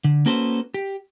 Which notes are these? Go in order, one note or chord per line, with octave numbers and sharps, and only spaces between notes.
D3
A#3 C#4 F#4 A4 B4 C5
G4